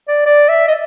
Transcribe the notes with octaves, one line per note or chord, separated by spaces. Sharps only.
D5
D5
E5
D#5